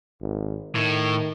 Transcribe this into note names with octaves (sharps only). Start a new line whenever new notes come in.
G#1
A2 D#3